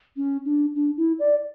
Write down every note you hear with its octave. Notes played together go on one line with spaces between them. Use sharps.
C#4
D4
D4
E4
D5